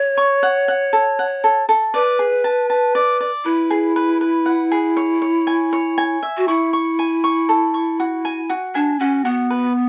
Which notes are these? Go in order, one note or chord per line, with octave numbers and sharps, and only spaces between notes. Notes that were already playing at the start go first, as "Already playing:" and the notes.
Already playing: C#5
C#6
F#5
F#5
A4
F#5
A4
A4
B4 D5
G#4
A5
A5
D5
D5
E4 B4
G#4
B4
B4
F#5
G#4
C#5
C#5
G#5
C#5
G#5
E5
F#4
E4 C#6
C#6
G#5
C#6
A4
C#6
F#4
G#5
F#4
D4 G#5
C#4 F#4
B3 F#4
B4